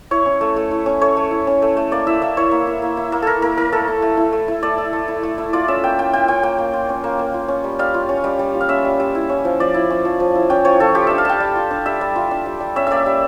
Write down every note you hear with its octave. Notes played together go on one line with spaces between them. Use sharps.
E4 C#5
C#4
A3
A3
E4
C#4
A3 C#5
A3
E4
C#4
A3
A3
A#3 D5
E4 E5
A#3 E5
E4 C#5
A#3
E4
A#3
E4
A#3
E4 A4 A#4
A#3 A#4
E4 A#4
A3 A4
E4
A3
E4
A3
E4
A3 D5
E4
A3
E4
A3
E4
F4 D5
C#4 E5
A#3 G5
A#3 G5
F4 G5
C#4 G5
A#3 G5
A#3
F4
C#4
A#3
A#3
F4
C#4
G3
G3 F5
F4
C#4
G3
G3
F4
F5
C#4 E5
G3
G3
E4
C#4
F3
F3 D5
E4
C#4
F3
F3
E4
C#4 G5
F3 C#5
F3 A4
F4 G4
D4 E5
F5
G3 G5 A5
G3
F4
D4
G3 E5
G3
F4
D4
G3
G3
C#4 E5
A#3 D5 E5
G3